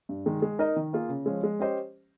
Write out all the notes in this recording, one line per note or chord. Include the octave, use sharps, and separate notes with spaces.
G2
D#3 G#3
G#3
D#4 A#4 D#5
D#3
A#3 F4 G#4
C#3
F3 G#3 C#4
G#3
C#4 G4 C5 D#5